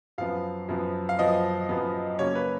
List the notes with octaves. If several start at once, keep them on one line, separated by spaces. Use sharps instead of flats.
F#2 F3 B3 F5
F#2 F3 B3
F5
F#2 F3 B3 D#5
F#2 F3 B3
C#3 F#3 A#3 C#4 C#5
B4